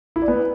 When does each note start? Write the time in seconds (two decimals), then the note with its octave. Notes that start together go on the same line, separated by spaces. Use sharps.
0.16 E4
0.22 D5
0.28 B3